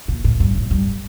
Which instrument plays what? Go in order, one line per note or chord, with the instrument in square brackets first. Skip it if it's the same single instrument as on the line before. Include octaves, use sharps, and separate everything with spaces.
[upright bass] A#2
A2
G2
A2
G2